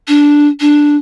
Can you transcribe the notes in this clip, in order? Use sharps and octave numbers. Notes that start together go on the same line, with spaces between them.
D4
D4